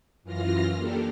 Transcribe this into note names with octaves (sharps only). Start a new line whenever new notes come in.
F#2 E3 F4 F6 A#6
A#3 D4 G4 A4